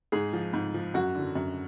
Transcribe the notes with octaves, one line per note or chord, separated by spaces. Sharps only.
G#2 G#4
F3
G#2
F3
F#2 F#4
D3 F#3
F#2